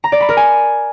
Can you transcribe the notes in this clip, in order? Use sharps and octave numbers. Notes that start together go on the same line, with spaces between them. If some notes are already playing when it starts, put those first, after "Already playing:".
A#5
D5
B5
A#4
G#5